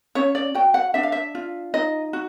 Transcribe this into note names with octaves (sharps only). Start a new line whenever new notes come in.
C#4 C#5
D5
F#4 G5
F#5
D4 E5
F5
E5
F4
D#4 D#5
F#4